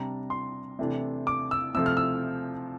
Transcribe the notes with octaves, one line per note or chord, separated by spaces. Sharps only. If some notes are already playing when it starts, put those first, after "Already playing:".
Already playing: C3 G3 D4 A#5
C6
C3 E3 A3 D4
D6
E6
C3 F3 A3 E6
F6
E6